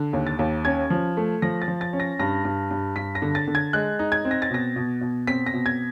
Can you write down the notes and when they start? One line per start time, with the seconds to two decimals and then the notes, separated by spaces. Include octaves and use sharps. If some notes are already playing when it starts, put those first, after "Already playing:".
Already playing: D3
0.13 D#2
0.27 A6
0.39 D#2
0.65 C#4 G#6
0.90 F3
1.17 A3
1.42 F3 A#6
1.62 A6
1.68 F3
1.81 A6
1.93 C#4
2.00 A#6
2.19 G2 A#6
2.45 G2
2.71 G2
2.96 G2 B6
3.15 A#6
3.22 D3
3.35 A6
3.47 D3
3.55 G#6
3.73 G#3 F#6
3.99 D#4
4.12 G#6
4.25 C4
4.31 A#6
4.42 A6
4.50 B2 A#6
4.76 B2
5.01 B2
5.27 C4 B6
5.46 A#6
5.54 B2
5.66 G#6